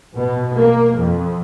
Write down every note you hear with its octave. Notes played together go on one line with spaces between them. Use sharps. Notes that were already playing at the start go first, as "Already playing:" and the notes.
B2
A#3
F2